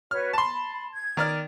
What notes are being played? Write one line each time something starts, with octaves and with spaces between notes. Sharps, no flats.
F#4 B4 C#5 F6
A5 B5 C6
G#6
D#3 D5 F6